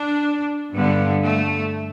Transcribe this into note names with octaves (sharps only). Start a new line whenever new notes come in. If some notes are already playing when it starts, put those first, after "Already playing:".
Already playing: D4
G2 D3 B3
A3